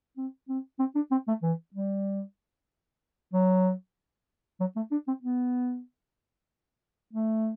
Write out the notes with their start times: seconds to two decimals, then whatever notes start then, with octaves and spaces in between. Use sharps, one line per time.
0.17 C4
0.49 C4
0.79 C4
0.95 D4
1.11 C4
1.28 A3
1.43 E3
1.74 G3
3.33 F#3
4.60 F#3
4.76 A3
4.91 D4
5.08 C4
5.23 B3
7.13 A3